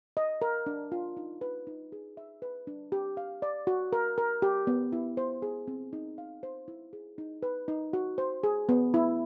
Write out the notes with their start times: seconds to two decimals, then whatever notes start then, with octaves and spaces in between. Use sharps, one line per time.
0.17 D#5
0.42 A#4
0.66 D4
0.92 F4
1.17 D#4
1.41 B4
1.67 D#4
1.92 G#4
2.17 E5
2.42 B4
2.67 D4
2.92 G4
3.17 F5
3.42 D5
3.67 F#4
3.93 A#4
4.18 A#4
4.42 G4
4.67 B3
4.92 E4
5.17 C5
5.42 G#4
5.68 C4
5.93 D#4
6.18 F5
6.43 C5
6.68 E4
6.93 G#4
7.18 D#4
7.43 B4
7.68 D#4
7.93 F#4
8.18 C5
8.43 G#4
8.69 B3
8.94 E4